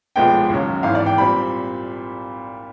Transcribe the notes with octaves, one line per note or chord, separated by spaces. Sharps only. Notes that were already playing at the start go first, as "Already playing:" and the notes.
B1 A#2 F3 G#3 B3 G5
D#2 C#3 F#3
G#1 G#2 E3 F5
D5
G5
A#2 G3 C4 B5